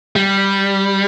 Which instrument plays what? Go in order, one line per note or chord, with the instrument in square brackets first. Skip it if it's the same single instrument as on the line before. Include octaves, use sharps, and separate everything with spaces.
[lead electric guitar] G3